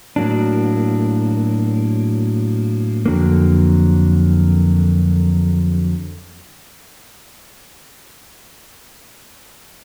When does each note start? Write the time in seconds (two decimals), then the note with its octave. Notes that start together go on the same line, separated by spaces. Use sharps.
0.16 A2 F#3 A#3 D4
3.06 F2 D3 F#3 A#3